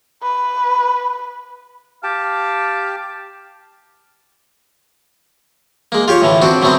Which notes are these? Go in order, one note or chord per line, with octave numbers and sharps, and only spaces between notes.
B4
G4 F5 G5 A5
G#3 A#3
F4 G4 C#5
A2 D3 E3
C4 D4 F#4
D3 F#3 A3 B3 C4